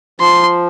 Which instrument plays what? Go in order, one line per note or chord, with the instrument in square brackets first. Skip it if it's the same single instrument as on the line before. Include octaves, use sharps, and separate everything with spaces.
[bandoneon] F3 [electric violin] C6